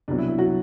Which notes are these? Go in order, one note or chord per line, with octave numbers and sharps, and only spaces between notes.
C2 B2 F#3 D4
E4
E4
F#3 F#4